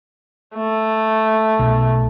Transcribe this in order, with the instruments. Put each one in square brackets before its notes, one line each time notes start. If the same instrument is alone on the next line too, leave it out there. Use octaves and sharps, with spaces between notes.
[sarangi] A3
[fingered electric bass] B1